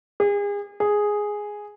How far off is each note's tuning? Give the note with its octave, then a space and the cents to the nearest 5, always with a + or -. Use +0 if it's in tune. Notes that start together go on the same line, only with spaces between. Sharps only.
G#4 -35
G#4 +0